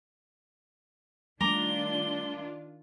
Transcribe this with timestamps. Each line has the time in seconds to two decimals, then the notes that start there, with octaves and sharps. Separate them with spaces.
1.41 D#3 G3 A3 D4 F4 A#5 D6 G7